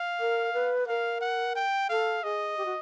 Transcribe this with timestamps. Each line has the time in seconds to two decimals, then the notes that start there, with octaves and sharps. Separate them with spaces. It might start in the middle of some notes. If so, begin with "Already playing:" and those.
Already playing: F5
0.20 A#4
0.53 B4
0.88 A#4 F5
1.21 F#5
1.56 G5
1.89 A4 F5
2.23 G#4 D#5
2.57 G4
2.65 F#4